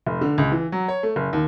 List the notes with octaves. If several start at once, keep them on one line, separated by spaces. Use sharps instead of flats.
F1
D3
C#2
E3
F#3
C#5
A3
F#1
D#2